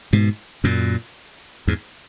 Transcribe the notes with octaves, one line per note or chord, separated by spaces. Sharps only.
G#2 B2
F#2 A#2
E2 G#2